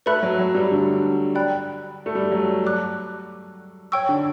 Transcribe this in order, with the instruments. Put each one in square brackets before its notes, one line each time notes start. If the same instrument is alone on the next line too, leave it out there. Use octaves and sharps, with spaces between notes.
[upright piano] A3 [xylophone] B4 E5 B5 F#6
[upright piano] F#3
F#3
G3
D3
[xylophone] D5 G5 B5 F#6
[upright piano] A3
G3
F#3
[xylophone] D5 A5 D6 F#6
C#5 G5 C#6 E6
[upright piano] D3